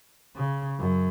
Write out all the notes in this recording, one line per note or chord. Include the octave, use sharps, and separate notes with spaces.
C#3
F#2